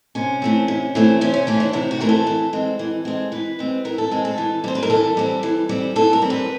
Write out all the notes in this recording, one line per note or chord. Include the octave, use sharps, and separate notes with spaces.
C3 C#4
E3 A3 C4
C3
E3 A3 C4
C3 C#4
C#4
E3 A3 C4 C#4
D4
C3 E4
F#4
E3 A3 C4 A#4
A4
E3
G#3 C4
E3
G#3 C4
E3 B4
G#3 C4
E3 A#4
A4
G#3 C4 G#4
A4
E3
G3 C4 C5
B4
A#4
E3 A4
G3 C4
E3
G3 C4
E3 A4
A#4
G3 C4
B4